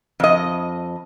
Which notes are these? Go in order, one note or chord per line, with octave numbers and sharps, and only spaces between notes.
F2 D#5